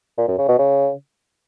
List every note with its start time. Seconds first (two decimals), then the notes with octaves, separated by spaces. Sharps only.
0.17 A#2
0.28 F#2
0.38 C#3
0.48 B2
0.58 C#3